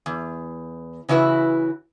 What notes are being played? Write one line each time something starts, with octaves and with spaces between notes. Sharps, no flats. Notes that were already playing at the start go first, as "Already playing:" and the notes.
E2
C#3 E3 E4 F#4 B4